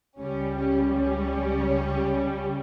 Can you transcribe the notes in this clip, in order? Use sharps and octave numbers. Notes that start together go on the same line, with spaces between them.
C#2 C#3 G3 C#4
C#4
C#4